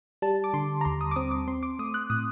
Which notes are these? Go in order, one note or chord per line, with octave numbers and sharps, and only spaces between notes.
G3 A5
D6
D3 C6
A#5
D#2 C6
D#6
D6
C4 D#6
D6
C4 C6
D6
A3 D#6
F#6
A2 D#6